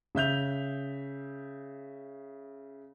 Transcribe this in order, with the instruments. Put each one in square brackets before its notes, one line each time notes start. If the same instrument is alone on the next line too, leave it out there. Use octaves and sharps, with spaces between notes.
[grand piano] C#3 E5 G6 F7